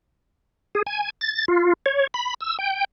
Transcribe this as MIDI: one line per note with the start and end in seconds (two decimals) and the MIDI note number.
0.75 0.82 68
0.86 1.10 80
1.21 1.45 93
1.48 1.73 65
1.86 2.07 73
2.14 2.34 83
2.41 2.57 88
2.59 2.84 79